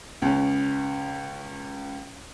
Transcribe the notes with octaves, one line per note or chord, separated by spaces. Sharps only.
C#2 C#4